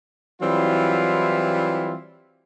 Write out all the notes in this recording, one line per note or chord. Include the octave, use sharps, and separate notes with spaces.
E3 F#3 G3 C4 E4 F4